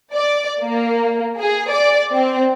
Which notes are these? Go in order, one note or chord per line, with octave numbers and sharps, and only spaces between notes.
D5
A#3
G#4
D5
C4